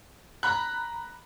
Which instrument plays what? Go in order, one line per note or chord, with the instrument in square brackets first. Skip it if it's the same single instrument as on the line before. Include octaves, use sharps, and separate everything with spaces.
[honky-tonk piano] A#5 B5 F#6